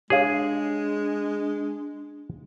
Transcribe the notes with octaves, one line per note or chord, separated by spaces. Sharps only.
G#3 D4 G4 G#4 C#5 F5